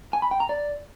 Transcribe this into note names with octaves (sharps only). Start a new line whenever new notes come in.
G#5
B5
G5
A#5
D5